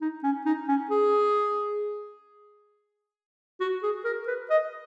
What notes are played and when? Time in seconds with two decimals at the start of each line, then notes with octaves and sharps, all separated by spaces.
0.01 D#4
0.23 C#4
0.46 D#4
0.68 C#4
0.91 G#4
3.60 F#4
3.83 G#4
4.05 A#4
4.27 B4
4.50 D#5